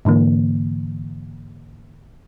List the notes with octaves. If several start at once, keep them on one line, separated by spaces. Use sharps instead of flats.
G#2 D3 E3 A#3